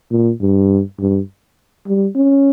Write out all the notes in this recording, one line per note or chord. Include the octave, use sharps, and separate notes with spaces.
A#2
G2
G2
G3
C#4